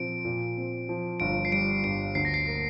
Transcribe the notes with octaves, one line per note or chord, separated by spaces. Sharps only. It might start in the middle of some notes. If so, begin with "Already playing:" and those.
Already playing: A#2 F3 C4 D7
A#2
C4
F3
G1 D7
C7
G3 D7
G2 D7
D2 C7
A#6
C7
A#3